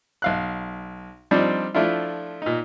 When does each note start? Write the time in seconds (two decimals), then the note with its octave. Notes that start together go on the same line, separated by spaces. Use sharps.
0.22 B1 F5 F#6
1.31 F3 G3 C4 D4 D#4
1.74 F3 A3 D4 E4 F4
2.42 A#2 D#4